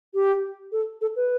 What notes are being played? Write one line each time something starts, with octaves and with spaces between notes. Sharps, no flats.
G4
A4
A4
B4